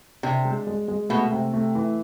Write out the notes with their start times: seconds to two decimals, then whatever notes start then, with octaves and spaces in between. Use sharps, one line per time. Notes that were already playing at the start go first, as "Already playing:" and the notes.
0.23 C3 D4
0.45 G#3
0.67 G#3
0.88 G#3
1.09 B2 A3
1.32 C3
1.53 A3
1.75 E3